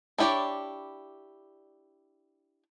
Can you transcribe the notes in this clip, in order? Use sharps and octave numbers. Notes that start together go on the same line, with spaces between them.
D4 E4 G4 C#5 D5